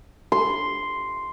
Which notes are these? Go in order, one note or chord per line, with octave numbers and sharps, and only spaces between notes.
C6